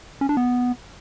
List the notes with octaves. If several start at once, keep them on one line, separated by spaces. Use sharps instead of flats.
C#4
D4
B3